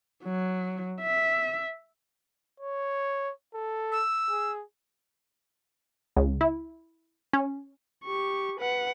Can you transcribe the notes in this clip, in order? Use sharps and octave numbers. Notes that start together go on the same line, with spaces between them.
F#3
E5
C#5
A4
E6
G#4
C#2
E4
C#4
G4 C#6
B4 F#5